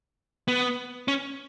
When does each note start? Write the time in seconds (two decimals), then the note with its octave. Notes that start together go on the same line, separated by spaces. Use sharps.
0.48 B3
1.08 C#4